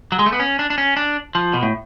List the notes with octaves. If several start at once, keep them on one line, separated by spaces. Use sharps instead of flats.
F#3
G#3
A3
B3
C#4
D4
D4
C#4
D4
F3
B2
A2